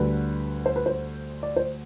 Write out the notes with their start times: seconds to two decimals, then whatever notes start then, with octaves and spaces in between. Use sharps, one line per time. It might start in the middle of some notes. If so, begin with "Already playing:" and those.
Already playing: D2 D3 G3 B4
0.66 C5
0.76 B4
0.86 C5
1.43 D5
1.56 C5